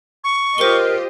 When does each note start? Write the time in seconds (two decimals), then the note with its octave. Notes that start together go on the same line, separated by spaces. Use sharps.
0.24 C#6
0.58 F4 G4 A#4 C5 D#5 G7